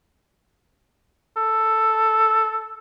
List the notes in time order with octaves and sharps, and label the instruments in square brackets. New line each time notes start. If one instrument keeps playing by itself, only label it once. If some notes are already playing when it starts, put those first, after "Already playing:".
[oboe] A4